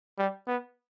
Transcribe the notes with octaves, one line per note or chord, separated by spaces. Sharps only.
G3
B3